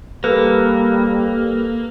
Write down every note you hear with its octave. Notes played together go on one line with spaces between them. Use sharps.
G3 A#3 A4 B4